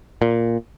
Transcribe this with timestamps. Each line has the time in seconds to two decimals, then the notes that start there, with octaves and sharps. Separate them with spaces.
0.22 A#2